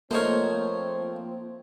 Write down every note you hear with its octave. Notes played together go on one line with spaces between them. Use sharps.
F3 A3 A#3 C4 D#4 A#4 C5 C#5